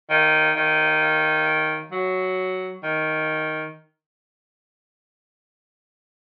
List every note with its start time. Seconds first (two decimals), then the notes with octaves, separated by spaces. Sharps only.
0.10 D#3
0.56 D#3
1.92 F#3
2.83 D#3